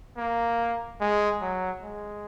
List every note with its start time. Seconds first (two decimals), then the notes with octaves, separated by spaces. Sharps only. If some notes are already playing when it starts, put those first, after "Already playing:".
0.17 A#3
1.01 G#3
1.41 F#3
1.83 G#3